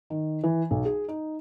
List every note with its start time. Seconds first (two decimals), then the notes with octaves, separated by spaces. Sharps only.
0.10 D#3
0.44 E3
0.71 B1
0.85 G#4
1.08 D#4